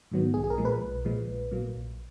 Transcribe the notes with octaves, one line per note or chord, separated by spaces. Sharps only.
G#2 D#3 F#3 B3
B1 G#4
G#4
A#4
A#2 F3 G#3
B4
B1
A#2 F3 G#3
A#1
A#2 F#3 A#3
A#1